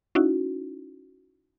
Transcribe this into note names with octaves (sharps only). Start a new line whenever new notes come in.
C#4 D#4 E4 F#4